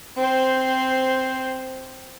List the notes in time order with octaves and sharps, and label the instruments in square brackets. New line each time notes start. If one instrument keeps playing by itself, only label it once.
[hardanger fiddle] C4 C5